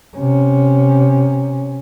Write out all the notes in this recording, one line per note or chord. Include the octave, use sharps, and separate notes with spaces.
C3 C#4